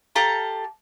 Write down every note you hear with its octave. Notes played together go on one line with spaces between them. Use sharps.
G4 A4 F5 A#5